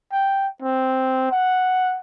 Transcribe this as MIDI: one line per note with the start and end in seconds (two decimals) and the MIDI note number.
0.12 0.47 79
0.62 1.28 60
1.32 1.99 78